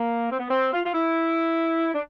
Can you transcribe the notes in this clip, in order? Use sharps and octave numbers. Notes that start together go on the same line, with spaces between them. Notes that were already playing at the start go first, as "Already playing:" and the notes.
Already playing: A#3
C4
B3
C4
F4
F4
E4
D4